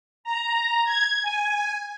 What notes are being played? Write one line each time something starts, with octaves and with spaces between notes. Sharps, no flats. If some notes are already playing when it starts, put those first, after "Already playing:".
A#5
G#6
G#5